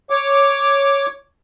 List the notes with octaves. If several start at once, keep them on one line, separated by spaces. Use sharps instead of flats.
C#5 D6